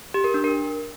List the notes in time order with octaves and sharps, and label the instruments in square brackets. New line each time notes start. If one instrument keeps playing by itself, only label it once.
[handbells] G4
A#4
D4
A#4